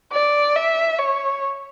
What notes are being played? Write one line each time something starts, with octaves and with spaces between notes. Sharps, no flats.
D5
E5
C#5